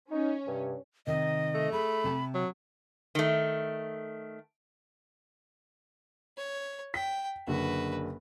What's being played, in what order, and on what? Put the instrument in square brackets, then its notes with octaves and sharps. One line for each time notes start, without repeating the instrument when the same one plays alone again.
[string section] C#4 [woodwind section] D#4
[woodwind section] G2 C3
[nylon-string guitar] C3 D#3 [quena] D#5
[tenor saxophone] A3
[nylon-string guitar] G#4 [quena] B5
[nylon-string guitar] C3 A5
[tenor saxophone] F#3
[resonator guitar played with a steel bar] D#3 A3
[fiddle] C#5
[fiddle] G5 [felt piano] B6
[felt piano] F#1 D3 D4 [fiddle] F#4 B4